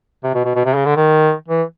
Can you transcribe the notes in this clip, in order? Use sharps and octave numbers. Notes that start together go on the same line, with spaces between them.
C3
B2
B2
B2
C3
C#3
D3
D#3
E3